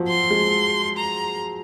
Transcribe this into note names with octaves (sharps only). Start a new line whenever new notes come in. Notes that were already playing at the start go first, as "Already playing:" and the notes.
Already playing: F3 F#3
C6
G#3
A#5